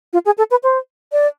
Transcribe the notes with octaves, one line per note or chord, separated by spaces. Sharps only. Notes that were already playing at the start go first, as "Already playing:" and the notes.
F4
G#4
A4
B4
C5
D5